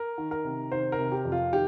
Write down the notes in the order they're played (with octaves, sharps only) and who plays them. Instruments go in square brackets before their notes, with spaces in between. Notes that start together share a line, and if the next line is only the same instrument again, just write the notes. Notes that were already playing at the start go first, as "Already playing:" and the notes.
Already playing: [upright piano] A#4
D#3
A#4
C3
D#3 C5
A#4
C3
G4
F2
F4
D#3 G4